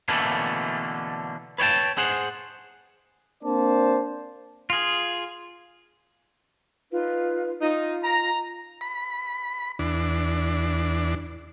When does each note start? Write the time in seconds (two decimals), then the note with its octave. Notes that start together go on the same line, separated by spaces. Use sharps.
0.08 B2 D3 E3 A3 A#3 C#4
1.58 B4 C#5 D5 G5 A5
1.98 G#4 C5 F#5
3.44 A#3 C4 D4 C5 D5 A5
4.70 F4 G#4
6.91 D#4 F4 B4
7.61 D#4 F4
8.03 A#5
8.81 B5
9.79 E2 D4